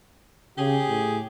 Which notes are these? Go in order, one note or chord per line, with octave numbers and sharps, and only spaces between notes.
C#3 G4 G#4
A2